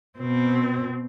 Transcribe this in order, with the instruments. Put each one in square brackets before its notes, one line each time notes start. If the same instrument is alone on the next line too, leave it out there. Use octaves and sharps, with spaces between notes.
[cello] B2 C4